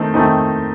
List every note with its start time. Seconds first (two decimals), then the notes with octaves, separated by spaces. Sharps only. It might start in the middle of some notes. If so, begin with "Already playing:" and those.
Already playing: D#3 A3 C4 D#4
0.14 D#3 A3 C4 D#4